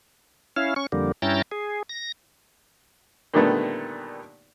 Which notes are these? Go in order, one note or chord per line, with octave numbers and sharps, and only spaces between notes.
C#4 E4 F5
C#4 C#6
F2 D3 G3 A#3
G2 C#4 E4 G5 A#5 A6
G#4
A#6
A#2 D3 D#3 G3 A3 B3